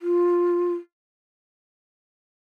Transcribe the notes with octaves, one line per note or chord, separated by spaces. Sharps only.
F4